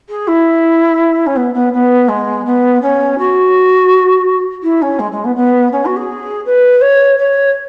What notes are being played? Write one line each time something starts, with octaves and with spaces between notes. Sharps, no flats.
G#4
E4
C#4
B3
B3
B3
G#3
B3
C#4
F#4
E4
C#4
G#3
G#3
B3
B3
C#4
F#4
G#4
B4
C#5
C#5